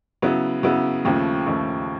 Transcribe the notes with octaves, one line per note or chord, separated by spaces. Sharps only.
C#3 F#3 B3 E4
C#3 F#3 B3 E4
D#2 C#3 F3 A3
D#2 C#3 F3 A3